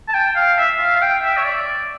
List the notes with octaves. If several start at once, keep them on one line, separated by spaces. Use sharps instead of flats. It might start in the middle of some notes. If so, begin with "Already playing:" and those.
A5
G5
F5
E5
F5
F5
G5
E5
C#5
D5